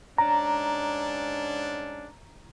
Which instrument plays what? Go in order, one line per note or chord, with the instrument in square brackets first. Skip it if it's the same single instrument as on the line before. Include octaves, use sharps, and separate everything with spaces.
[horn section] G#2 C#4 D4 [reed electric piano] A#5